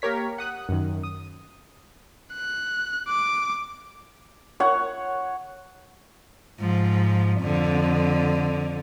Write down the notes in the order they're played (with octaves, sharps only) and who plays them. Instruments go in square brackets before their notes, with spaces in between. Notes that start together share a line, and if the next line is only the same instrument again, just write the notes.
[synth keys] A#3 G4 A#4 C#5 B6
F#5 D#6 F#6
F#2 D#3
D#6
[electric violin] F#6
D6
[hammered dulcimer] C#5 F#5
[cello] G#2 F3
F2 D3